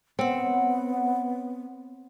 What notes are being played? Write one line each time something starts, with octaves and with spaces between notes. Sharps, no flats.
B3 C4 C#5 F#5